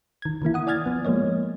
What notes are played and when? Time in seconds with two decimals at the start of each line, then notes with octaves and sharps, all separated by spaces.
0.22 D#3 G#6
0.42 D#3 E3 A#3 E4
0.54 F#5 D#6
0.67 D5 G#5 F6 G#6 A6
0.86 F3 B3
1.05 F3 G#3 A#3 C#5 D#5